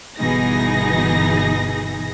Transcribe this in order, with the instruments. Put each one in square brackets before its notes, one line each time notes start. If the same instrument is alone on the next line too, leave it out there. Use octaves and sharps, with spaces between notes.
[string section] G1 B2 E3 D#4 G#4 A#6